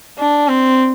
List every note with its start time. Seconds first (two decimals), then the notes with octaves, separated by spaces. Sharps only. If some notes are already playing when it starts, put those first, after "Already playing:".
0.18 D4
0.48 C4